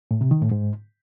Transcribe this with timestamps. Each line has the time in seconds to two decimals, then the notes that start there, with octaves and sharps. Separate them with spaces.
0.11 A2
0.21 C3
0.31 D#3
0.41 A2
0.51 G#2